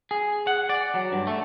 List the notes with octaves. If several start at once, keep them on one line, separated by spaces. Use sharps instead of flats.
G#4
F#5
D5
F#3
G2
A3